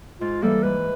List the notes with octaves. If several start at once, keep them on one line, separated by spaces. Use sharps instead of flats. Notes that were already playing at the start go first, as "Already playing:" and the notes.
G#2 F4
E3 G3 A#3 A4
G#2 B4